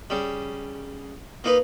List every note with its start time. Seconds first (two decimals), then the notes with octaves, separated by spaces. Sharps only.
0.10 C#3 G3
1.44 A#3 D#4 B4